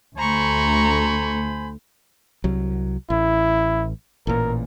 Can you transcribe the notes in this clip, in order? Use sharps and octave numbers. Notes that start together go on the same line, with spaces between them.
D2 A3 C5 G#5 A#5 B5 C#6
C2 F#3
A1 E4
A1 A#2 A#4